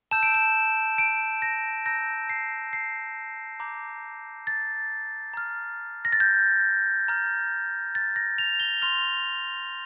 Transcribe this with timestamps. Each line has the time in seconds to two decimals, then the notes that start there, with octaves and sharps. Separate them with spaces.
0.11 A5 E6 G6 E7
0.23 D7
0.34 E7
0.98 D7
1.42 A#6
1.86 A#5 E6 G6 A#6
2.30 C7
2.73 C7
3.60 A#5 D6 G6
4.47 A6
5.34 A#5 F6
6.05 A#6
6.13 A6
6.20 G6
7.08 A#5 F6
7.95 A6
8.16 A#6
8.38 F7
8.60 G7
8.82 C6 F6 F7